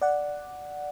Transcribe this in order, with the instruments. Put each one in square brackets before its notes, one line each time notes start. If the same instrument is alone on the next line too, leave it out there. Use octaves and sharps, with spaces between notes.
[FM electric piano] D5 F#5